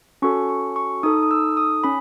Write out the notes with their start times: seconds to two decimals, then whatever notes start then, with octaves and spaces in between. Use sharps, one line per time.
0.22 C#4 F#4 A4 C#6
0.49 C#6
0.76 C#6
1.03 D#4 A4 D#6
1.23 D#6
1.31 E6
1.57 D#6
1.84 C#4 B5